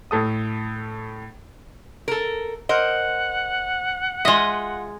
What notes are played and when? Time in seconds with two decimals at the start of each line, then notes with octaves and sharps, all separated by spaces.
0.11 A2 A4 D#6
2.08 A4 A#4
2.69 A#4 C5 D#5 F#5
4.25 G#3 F4 D#5 E5